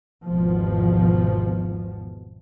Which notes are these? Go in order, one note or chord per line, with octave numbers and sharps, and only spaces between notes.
G#1 E2 B2 F3